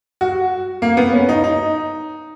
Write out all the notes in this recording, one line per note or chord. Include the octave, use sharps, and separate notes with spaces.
F#4
A#3
B3
C#4
D#4
D#4